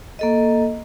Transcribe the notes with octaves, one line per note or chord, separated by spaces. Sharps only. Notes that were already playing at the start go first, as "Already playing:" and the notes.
A#3 A4 D#5